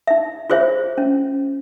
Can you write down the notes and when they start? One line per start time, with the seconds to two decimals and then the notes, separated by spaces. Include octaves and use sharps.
0.07 D#4 E5
0.50 F4 G#4 C5 C#5 E5
0.98 C#4